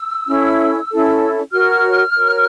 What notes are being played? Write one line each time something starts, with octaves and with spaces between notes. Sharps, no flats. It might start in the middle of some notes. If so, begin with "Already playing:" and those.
Already playing: E6
C#4 E4 A4
C#4 E4 A4
F#4 A#4 C#5 F6
F#4 A#4 C#5